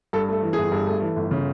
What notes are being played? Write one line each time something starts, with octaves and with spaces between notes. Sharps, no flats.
G2 A4
A3 A4
E3
G1 G#4
G2
A3
E3
G1
C#3